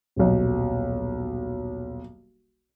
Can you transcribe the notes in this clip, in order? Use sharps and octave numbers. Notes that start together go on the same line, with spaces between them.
D#1 B1